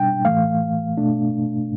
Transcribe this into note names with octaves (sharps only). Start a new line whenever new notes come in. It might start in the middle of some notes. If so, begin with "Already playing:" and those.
Already playing: B2 G3 D4 G5
A2 E3 A3 F5
B2 A3 D4